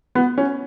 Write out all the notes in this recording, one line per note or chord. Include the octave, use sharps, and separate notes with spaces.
B3
C#4